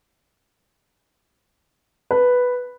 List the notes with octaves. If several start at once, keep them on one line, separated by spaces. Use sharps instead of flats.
B4